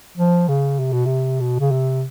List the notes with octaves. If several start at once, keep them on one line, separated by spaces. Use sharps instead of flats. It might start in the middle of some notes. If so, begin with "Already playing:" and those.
F3
C#3
C3
B2
C3
B2
C#3
C3